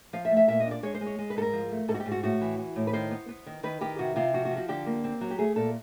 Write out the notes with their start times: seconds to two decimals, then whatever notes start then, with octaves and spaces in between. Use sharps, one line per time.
0.13 F3 F5
0.25 E5
0.31 A3
0.36 E5
0.48 A#2 E5
0.60 D#5
0.66 D4
0.71 D5
0.83 G#3 C#5
0.94 C5
1.01 G#3
1.07 C#5
1.19 G#3
1.30 B4
1.36 G#2 A4
1.42 A#4
1.53 F3
1.71 A3
1.88 G#2 A4
1.94 F#4
2.00 G4
2.06 G#2
2.11 F#4
2.23 A2 F#4
2.41 E3
2.58 E3
2.76 A2
2.87 B4
2.93 D#3 C5
3.11 B3
3.29 B3
3.46 D#3
3.63 D#3 B4
3.81 D#3 G4
3.98 C3 F#4
4.16 C3 F4
4.33 F3 F#4
4.45 F#4
4.51 F3
4.57 F#4
4.68 D3 G4
4.86 A#3
5.04 C4
5.21 F#3
5.31 G4
5.38 A3 G#4
5.56 A#2 A4